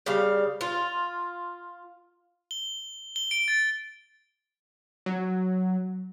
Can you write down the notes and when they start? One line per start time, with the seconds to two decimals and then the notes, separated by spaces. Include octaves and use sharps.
0.06 C#3 G3 F5
0.61 F4
2.51 G7
3.16 G7
3.31 D7
3.48 A6
5.06 F#3